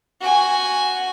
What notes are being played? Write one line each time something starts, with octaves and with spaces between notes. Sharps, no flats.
F#4 G#5